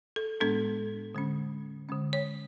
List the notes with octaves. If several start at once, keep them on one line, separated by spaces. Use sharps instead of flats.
A4
A2 G#3 B3 D4 A4
D3 G#3 C#4
D3 G#3 C#4
C#5